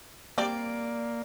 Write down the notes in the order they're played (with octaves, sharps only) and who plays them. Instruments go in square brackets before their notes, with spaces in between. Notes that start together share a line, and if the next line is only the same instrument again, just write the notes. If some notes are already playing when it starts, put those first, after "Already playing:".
[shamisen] G3 C4 [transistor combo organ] A#3 [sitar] D5